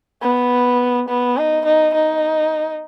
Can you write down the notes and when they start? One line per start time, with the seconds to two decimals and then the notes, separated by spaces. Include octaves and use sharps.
0.22 B3
1.09 B3
1.37 D#4
1.65 D#4
1.94 D#4